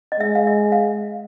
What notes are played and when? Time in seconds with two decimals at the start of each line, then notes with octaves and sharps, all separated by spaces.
0.12 D#5
0.20 G#3 E5
0.35 F5
0.47 E5
0.72 F5